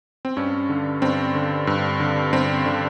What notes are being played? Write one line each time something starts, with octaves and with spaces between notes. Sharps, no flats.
C4
G2 C#4
D3
G2 C4
D3
G2
D3
G2 C4
D3